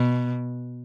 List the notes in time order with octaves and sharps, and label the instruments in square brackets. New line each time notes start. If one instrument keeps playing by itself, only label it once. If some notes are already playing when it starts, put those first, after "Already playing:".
Already playing: [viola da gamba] B2